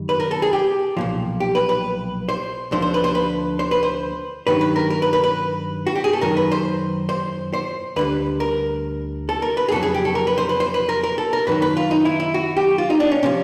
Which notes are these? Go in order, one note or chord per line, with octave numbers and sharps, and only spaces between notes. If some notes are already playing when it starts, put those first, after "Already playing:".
Already playing: F#2 D#3 G3
B4
A#4
A4
G#4
G4
B1 A#2 F3
G4
B4
B4
C5
D2 D3 F3 C5
C5
B4
C5
B4
C5
B4
C5
G2 D#3 F#3 B4
B4
A#4
A#4
B4
B4
B4
F#4
G4
G#4
A4
F#2 D#3 F#3 A#4
B4
C5
C5
C5
D2 D3 G3 B4
A#4
A4
A#4
B4
G#4
F2 C#3 F#3 A4
G#4
G4
A4
A#4
B4
C5
B4
C5
B4
A#4
A#4
A4
A#4
F#2 D#3 F#3 B4
B4
F4
D#4
E4
E4
F#4
G4
F4
D#4
D4
C#4
C3 F3 C#4